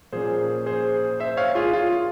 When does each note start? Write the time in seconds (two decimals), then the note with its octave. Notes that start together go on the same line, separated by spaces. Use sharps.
0.12 A#2 F3 A#3 C#4 G#4 C5
0.66 G#4 C5
1.20 C5 E5
1.37 C#5 F5
1.55 F4 G#4
1.73 F4